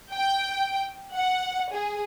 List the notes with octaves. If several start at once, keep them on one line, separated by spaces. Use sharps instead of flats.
G5
F#5
G#4